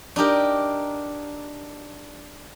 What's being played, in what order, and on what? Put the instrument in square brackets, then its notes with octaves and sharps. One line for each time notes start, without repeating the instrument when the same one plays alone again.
[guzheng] D4 D#4 G4 A#4